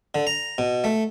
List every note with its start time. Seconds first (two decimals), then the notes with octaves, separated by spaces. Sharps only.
0.15 D3
0.27 A#5
0.58 B2
0.84 A3